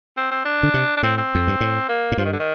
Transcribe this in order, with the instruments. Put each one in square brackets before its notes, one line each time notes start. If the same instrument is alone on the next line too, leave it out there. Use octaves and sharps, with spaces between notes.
[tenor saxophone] C4
C4
D4
[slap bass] D3
C3
[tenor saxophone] D4
[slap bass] A2 [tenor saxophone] C4
[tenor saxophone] C4
[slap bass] F2
G2
A2
[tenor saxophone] A#3
[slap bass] A2
[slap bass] G2 [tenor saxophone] F3
[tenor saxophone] D#3
D3
D#3